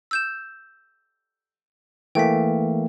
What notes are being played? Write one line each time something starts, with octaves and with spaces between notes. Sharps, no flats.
E6 G6 E7
E3 A3 A#3 G5 B6